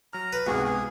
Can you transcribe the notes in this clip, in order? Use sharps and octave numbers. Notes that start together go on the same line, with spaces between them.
F#3 A#5 F6
B4
C#2 G#2 C3 B3 F#4 G#4
G#4